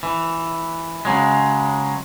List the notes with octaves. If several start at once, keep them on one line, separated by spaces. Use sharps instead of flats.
E3
C#3 F#3 G#3